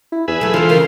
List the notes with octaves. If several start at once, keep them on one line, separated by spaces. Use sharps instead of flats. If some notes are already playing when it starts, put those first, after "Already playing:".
E4
E2 G#4 B4 E5
F#3 A3 A4
D3 E3 G#3 F4 A4 C5
C#3 F3 A#4